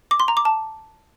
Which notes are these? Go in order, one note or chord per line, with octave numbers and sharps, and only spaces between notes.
D6
C6
A#5
D6
A5